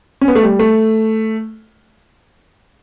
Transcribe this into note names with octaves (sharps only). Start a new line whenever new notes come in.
C#4
B3
A3
G3
A3